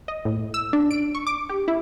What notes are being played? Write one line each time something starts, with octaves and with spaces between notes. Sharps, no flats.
D#5
A2
E6
D4
D7
C#6
D6
G4
E4